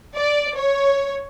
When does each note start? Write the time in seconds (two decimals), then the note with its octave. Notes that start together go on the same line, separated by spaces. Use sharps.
0.15 D5
0.56 C#5